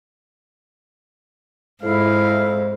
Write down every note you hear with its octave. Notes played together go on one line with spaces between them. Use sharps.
F2 G#2 E4 F5